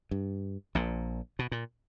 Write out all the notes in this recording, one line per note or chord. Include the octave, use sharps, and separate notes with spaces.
G2
A#1 A#2
B2
A#2